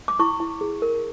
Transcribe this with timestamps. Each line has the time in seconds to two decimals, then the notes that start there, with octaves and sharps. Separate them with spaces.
0.08 D6
0.19 E4 C#6
0.40 E4
0.61 G#4
0.82 A#4